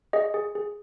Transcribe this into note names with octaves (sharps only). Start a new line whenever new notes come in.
G#4 D#5
G#4
G#4